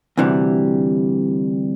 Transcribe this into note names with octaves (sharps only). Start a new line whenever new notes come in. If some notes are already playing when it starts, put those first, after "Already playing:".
D2 C3 E3 G3